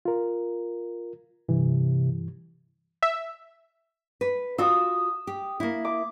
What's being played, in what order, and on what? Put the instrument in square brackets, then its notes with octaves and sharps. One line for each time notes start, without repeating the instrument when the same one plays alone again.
[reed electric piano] F4 A#4
[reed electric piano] G2 E3 [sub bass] C3
[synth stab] E5
[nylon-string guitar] B4
[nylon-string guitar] F4 F#4 [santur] D#6 E6
[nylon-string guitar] G4
A#3 E4
[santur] D6